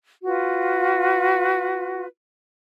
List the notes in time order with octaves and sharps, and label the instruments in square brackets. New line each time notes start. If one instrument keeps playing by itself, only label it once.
[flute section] F4 F#4 B4